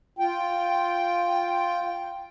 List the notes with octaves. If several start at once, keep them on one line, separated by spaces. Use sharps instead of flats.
F4 G5